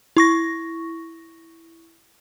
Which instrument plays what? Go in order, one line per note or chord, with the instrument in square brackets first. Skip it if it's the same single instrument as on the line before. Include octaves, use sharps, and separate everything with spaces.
[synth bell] E4 C#6 A#6